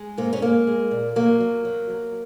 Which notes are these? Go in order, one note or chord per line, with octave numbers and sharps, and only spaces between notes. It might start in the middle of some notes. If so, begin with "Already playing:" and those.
Already playing: G#3
G#2 A#3
C#4
G#3 A#3
G#3
A#2
F#3 A#3
F#3
F#3
F#3